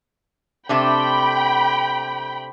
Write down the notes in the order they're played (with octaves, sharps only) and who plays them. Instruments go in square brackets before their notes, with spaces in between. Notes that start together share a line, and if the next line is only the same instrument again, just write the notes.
[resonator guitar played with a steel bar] C3 A3 D4 [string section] G5 B5